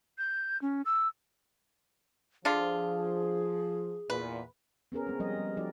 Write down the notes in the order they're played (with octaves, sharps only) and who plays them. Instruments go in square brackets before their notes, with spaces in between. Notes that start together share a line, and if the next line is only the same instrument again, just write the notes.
[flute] G6
C#4
E6
[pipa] D3 D4 F4 [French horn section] F3 [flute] G#4
[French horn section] E2 A#2 [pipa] B4
[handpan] B3 C#4 G#4 A#4
G#3 C4
F3 G3 G#3 A#4 D#5
G3
F3 D#4 F#4 G4 D5 D#5